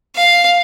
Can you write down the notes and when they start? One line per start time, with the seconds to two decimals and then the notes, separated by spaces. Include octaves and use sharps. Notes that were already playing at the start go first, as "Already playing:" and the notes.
0.16 F5